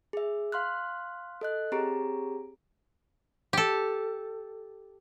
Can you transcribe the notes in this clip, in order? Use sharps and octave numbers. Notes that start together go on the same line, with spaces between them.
G#4 E5
F5 C6 F6 F#6
A4 D#5 F#6
C4 G4 G#4 C#5 A#5 D7
G4 A4